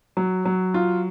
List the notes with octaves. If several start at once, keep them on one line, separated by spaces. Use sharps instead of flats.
F#3
F#3
F4